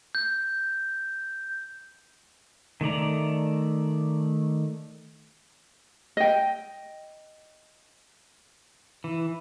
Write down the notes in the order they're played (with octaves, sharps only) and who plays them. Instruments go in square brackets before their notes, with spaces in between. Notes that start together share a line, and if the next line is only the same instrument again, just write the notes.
[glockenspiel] G6
[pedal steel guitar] D#3 A3 D5 A#5
[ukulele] D#5 G5
[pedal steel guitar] E3